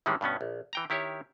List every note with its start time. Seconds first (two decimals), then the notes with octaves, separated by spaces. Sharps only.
0.06 A2 D#3 E3 G3 G#3 C#4
0.21 G2 B2 B3 C#4
0.41 A#1
0.73 E3 G5 A#5
0.90 D#3 E4 G4 C#5